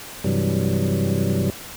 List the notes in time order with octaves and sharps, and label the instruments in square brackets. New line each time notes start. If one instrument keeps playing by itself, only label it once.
[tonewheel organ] G2 C3 E3 F#3 G3